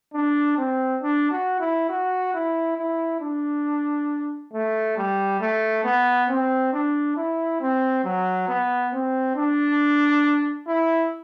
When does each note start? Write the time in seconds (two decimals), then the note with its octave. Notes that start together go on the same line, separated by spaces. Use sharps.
0.14 D4
0.58 C4
1.02 D4
1.31 F#4
1.60 E4
1.90 F#4
2.34 E4
2.78 E4
3.21 D4
4.54 A3
4.97 G3
5.41 A3
5.84 B3
6.30 C4
6.73 D4
7.17 E4
7.61 C4
8.04 F#3
8.48 B3
8.93 C4
9.36 D4
10.68 E4